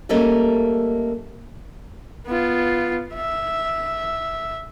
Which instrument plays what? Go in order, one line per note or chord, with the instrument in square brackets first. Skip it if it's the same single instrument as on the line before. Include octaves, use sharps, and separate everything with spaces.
[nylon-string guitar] G3 A3 A#3 C#4 A4 D#5
[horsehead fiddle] B3 F4
E5